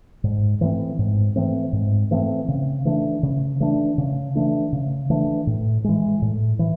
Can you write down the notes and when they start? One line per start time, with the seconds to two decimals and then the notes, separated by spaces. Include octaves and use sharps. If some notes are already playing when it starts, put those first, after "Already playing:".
0.24 G#2
0.61 E3 A3 C4
0.99 G#2
1.36 E3 A3 C4
1.73 G#2
2.11 E3 A3 C4
2.48 C#3
2.85 E3 A3 D4
3.23 C#3
3.60 E3 A3 D4
3.98 C#3
4.35 E3 A3 D4
4.73 C#3
5.10 E3 A3 D4
5.47 A2
5.84 E3 G#3
6.22 A2
6.59 E3